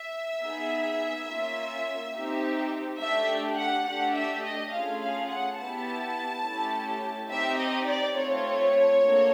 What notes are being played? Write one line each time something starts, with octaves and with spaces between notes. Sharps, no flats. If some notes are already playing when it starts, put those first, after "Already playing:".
Already playing: E5
B3 D#4 G#4
A#3 C#4 F4
C4 D#4 G4
A3 D4 G4 E5
F#5
A3 D4 G4 F#5
E5
D#5
A3 C#4 F4 G#4 F5
F5
F#5
B3 E4 G4 A5
A3 C#4 E4 G4
C4 D#4 G4 E5
D#5
D5
A3 C4 F4 C#5
A#3 D4 F#4 A4